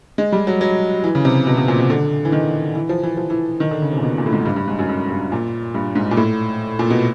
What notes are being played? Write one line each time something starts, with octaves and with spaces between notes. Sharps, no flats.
G#3
G3
F#3
F#3
E3
C#3
C3
B2
B2
A#2
C3
D3
E3
D#3
E3
F3
E3
F3
E3
D#3
D3
C#3
C3
A#2
B2
A#2
A2
G#2
G2
G2
G#2
F#2
F#2
G2
A#2
G2
G#2
A#2
A2
A#2
B2